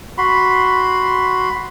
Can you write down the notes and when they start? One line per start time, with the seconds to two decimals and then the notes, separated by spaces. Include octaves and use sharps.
0.18 F#4 B5 C6